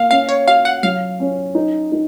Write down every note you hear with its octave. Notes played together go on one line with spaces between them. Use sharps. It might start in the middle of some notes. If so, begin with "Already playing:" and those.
Already playing: A#3 F5
C#4 F5
C#5
F#4 F5
F#5
F#3 F5
C#4
D#4
D#4